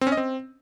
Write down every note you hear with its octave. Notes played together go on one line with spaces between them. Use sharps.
C4
C#4
D#5
C4